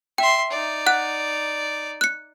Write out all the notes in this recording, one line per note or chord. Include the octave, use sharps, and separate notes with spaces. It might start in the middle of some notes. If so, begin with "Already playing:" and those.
E5 G5 C6
D#4 D5
F#5 F#6
F#6 C#7